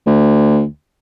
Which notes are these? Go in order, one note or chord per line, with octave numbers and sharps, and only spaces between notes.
D2